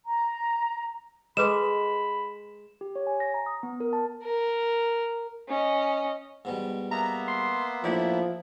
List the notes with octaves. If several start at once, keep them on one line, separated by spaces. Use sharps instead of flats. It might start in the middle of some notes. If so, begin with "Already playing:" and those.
A#5
G#3 A4 B4 B5 D6 E7
G4
C#5
G#5
A#6
A#5
D#6
B3
A#4
A5
A#4
C#4 D#5
G#2 B2 G3
A#3 B3 E5 A#5
C6
A#1 A2 F3 E4 D5